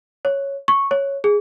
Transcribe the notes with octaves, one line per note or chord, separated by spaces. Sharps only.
C#5
C#6
C#5
G#4